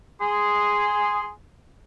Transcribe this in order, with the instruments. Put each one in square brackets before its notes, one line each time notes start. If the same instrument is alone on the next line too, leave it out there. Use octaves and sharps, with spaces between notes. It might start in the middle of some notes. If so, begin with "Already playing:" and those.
[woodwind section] G#4 C6